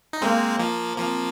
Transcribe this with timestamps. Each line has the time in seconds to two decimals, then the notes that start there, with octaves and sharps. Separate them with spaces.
0.13 D#4
0.22 G#3 A#3 C4
0.59 F3 A#3
0.97 F3 A#3 C4